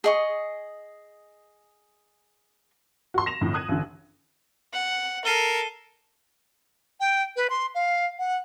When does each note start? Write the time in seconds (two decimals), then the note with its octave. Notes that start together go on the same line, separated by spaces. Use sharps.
0.04 G#4 D#5 C#6
3.14 F#4 C6
3.26 A#6 E7 F7
3.41 F2 A2 D3
3.54 D#6 F#6 G#6 D#7
3.68 A1 D3
4.73 F#5
5.25 A4 A#4 C7 D#7 G7
7.00 G5
7.36 B4
7.50 C6
7.75 F5
8.19 F#5